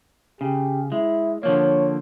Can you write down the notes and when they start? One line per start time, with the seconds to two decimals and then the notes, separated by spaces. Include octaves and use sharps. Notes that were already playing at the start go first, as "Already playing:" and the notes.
0.41 C#3 G4
0.92 G#3 E4
1.43 D3 F3 A#3 C#5